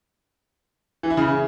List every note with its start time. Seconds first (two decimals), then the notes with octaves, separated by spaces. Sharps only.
1.03 E3
1.10 E4
1.17 C#3